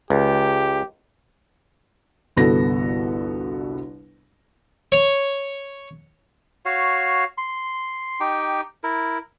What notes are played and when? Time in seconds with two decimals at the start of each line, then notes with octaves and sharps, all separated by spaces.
0.10 C#2 G4
2.37 G1 C2 B3 F#4 A4 A#6
4.92 C#5
6.65 F#4 C#5 F5
7.38 C6
8.20 D#4 G4 G5
8.84 E4 A#4